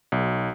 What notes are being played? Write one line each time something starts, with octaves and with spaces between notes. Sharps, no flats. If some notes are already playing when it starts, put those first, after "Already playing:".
B1